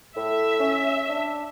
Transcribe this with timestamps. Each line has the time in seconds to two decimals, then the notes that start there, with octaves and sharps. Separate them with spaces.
0.16 A2 E5
0.60 C#4
1.09 D4